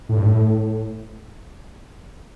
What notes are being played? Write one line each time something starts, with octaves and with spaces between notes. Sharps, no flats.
A2
G2
A2